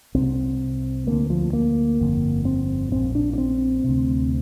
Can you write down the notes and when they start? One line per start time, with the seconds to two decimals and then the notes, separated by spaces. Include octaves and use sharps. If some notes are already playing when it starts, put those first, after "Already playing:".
0.14 C2 C3 C4
1.07 D2 D3 A#3
1.30 F3
1.53 A#3
1.99 G1 F2 D3
2.45 C4
2.92 A#1 A#2 C4
3.15 D4
3.33 D4
3.38 C4
3.84 D2 C3